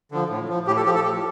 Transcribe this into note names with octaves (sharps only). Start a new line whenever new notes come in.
D3 F3
A2
F3
A2 G4
A4
F3 G4
A4
A2 G4